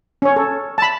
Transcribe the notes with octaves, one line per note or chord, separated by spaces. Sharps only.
C#4 C#5
A4
A5 B5